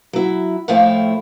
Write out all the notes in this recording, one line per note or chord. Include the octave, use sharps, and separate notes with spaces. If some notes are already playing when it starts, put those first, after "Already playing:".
F#3 E4
A2 F3 A3 E4 F5 G5